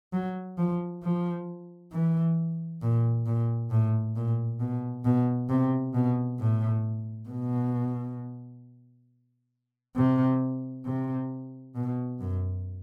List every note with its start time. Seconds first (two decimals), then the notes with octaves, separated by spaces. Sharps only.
0.13 F#3
0.58 F3
1.03 F3
1.92 E3
2.82 A#2
3.26 A#2
3.71 A2
4.16 A#2
4.60 B2
5.05 B2
5.49 C3
5.94 B2
6.39 A2
7.29 B2
9.96 C3
10.86 C3
11.75 B2
12.20 F#2